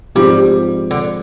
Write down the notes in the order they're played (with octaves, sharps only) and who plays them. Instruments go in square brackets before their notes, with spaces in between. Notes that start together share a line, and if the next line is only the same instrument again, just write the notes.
[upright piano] G#2 F3 C4 F4 G#4 [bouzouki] G3
[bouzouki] D3